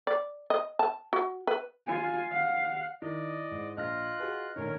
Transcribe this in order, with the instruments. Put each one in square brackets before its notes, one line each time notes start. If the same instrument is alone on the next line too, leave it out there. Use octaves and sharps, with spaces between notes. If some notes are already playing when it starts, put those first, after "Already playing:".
[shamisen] D5
D#5
A5
F#4
B4
[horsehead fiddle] F4 G#5
F5 F#5
[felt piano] D#3 [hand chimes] E4 [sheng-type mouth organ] D5 D#5
[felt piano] G#2
[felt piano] A#1 [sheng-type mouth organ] F4 F#6 [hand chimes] D#5 F6 A#6
[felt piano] F#4 G#4 B4
[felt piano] A#1 A2 D#3 [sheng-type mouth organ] C#4 A#4 C#5